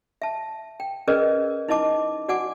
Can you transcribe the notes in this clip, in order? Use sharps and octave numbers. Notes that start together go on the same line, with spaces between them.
E5 A5
G5
C#4 G#4 A#4 B4 D5 D#5
D#4 E4 D#5 A5 D6
F#4 D5 F#5 G#5 D6